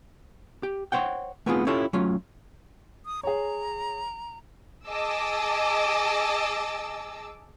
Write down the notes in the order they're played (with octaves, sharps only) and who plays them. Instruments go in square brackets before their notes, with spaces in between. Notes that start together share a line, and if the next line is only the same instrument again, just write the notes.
[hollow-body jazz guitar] G4
C5 C#5 F#5 G5
A3 B3 C4 D#4 F4 G#4
C#4 E4 F4 G4 A4 C#5
F#3 A3 C#4 F4
[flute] D#6
[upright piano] G#4 C#5 [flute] A#5
[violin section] G#4 D#5 A5 D6 E6